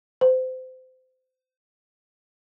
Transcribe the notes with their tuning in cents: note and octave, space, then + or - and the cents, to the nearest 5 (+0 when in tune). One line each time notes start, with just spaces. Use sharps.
C5 -30